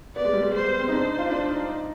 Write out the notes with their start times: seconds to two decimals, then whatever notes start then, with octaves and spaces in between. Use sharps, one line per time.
0.16 B3 D5
0.25 G#3
0.33 G3
0.42 G#3
0.54 G#3 C5
0.67 B3
0.80 C4
0.88 D#4
0.92 D4 C5
1.05 D#4
1.19 F4
1.31 D4
1.50 D#4
1.69 D#4